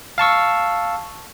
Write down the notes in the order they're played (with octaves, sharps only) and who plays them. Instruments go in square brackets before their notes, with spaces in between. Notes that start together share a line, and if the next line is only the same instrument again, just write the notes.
[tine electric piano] F5 A5 C#6 E6